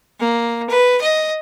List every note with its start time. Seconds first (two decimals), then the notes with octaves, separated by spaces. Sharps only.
0.20 A#3
0.69 B4
1.01 D#5